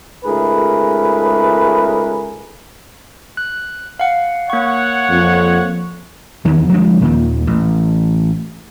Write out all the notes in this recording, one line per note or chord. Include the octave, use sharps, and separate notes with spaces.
C#2 G#2 A3 G#4 A#4 B4
F#6
F5 F#5
A#3 C#5 F#5 C#6
F2
E2 D#3 E3
F3 G3 G#3 D4
D#2 A#2 D#3
A1